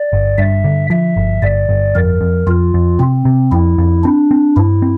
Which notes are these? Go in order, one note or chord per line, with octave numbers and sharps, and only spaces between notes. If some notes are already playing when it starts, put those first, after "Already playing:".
Already playing: D5
G1
G2 E5
D3
F3 E5
G1
G1 D5
G1
F2 A#4
F2
F2 F4
F2
C3 C4
C3
F2 E4
F2
C4 D4
C4
G2 E4
C4